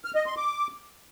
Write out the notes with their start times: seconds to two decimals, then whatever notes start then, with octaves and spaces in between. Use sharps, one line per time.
0.05 F6
0.15 D#5
0.26 C6
0.37 D6